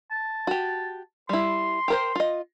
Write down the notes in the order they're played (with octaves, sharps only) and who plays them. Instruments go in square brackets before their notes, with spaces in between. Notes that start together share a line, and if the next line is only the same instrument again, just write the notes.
[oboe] A5
[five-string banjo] F#4 G4
[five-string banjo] G3 E4 [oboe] C6
[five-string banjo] G4 A#4 C5
F4 D#5